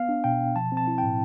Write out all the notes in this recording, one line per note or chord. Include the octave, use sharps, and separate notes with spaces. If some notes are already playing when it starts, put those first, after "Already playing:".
Already playing: B3 F5
D4
B2 G5
B2
F3 A5
C4
A5
E4
G5
A2